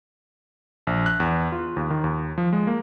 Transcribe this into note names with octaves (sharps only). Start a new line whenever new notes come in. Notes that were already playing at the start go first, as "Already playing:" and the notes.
A#1
F#6
E2
F4
D#2
D#3
D#2
F3
G#3
A#3